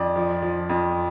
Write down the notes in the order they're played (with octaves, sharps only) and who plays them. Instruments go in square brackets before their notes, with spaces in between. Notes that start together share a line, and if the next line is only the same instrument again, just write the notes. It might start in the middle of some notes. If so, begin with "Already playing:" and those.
Already playing: [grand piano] F2 D5
F3
F3
F2